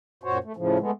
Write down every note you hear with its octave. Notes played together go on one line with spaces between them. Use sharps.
F#2 A#2 F#4 C5 C#5
A3
A2 C#3 F3
G#3 A3 B3